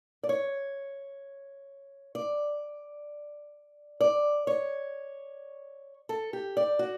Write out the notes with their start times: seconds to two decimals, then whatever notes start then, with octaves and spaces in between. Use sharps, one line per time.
0.23 D5
0.29 C#5
2.15 D5
4.01 D5
4.47 C#5
6.09 A4
6.33 G4
6.57 D5
6.79 F#4